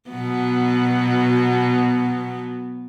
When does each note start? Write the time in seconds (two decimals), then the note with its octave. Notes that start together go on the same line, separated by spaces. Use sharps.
0.10 B2 F#3 B3